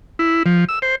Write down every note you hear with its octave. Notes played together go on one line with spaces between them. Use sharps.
E4
F3
E6
C5